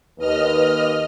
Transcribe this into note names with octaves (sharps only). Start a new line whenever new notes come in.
D#2 B4 D#5 F6